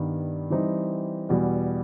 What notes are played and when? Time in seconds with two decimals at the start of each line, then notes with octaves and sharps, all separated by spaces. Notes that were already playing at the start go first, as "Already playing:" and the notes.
Already playing: G2 D#3 G3 B3
0.50 E3 G3 C4 D#4
1.29 E2 B2 G3